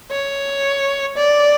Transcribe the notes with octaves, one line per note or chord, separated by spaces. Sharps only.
C#5
D5